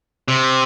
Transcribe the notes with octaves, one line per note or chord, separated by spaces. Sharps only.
C3